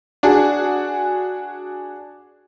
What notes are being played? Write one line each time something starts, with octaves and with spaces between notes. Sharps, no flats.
D4 F#4 G#4